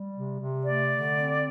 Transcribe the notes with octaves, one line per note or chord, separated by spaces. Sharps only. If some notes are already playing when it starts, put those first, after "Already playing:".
Already playing: G3
C3
C3
A3 D5
D3
C4